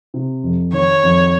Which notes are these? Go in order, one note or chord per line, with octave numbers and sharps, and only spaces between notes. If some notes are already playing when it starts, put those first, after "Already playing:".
C3
F2
D#3 C#5
F2